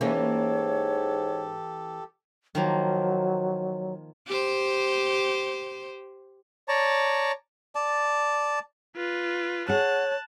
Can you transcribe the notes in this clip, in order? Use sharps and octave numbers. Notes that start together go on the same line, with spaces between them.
G#2 E3 A#3 C#4 G4 A4 C#5
D#3 F3 F#3 A#3
G4 C5
C#5 D5 A5 A#5
D5 A5
F4 B4
G#4 C#5 F#5 A5 F#6